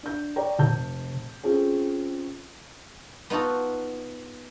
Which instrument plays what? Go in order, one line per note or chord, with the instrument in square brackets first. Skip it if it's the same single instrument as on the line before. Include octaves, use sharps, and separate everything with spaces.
[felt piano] D4 G6
C#5 D5 G5 A#5
F1 A5 G6
C4 C#4 F4 G#4 A4
[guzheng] B3 D#4 F4 F#4 A4